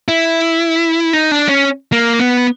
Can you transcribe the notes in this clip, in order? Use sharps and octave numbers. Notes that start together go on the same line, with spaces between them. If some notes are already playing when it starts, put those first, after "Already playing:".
E4
D#4
D4
C#4
A#3
B3